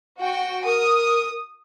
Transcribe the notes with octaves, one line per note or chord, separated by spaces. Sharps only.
F#4 G5
A#4 D#6